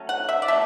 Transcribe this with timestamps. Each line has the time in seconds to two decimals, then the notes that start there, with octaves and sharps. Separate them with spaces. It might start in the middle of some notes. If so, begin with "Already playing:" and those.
Already playing: F#3 A3 C#4
0.09 F#5
0.29 E5
0.42 D5
0.48 F#3 A3 E5